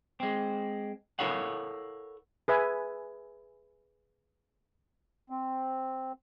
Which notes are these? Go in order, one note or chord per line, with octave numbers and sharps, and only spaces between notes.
G#3 C4
E4 A4 A#4 C#5 F5 F#5
G#4 B4 E5 G#5
C4